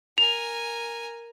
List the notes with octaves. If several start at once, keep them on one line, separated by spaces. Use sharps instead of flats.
A#4 G#5 F7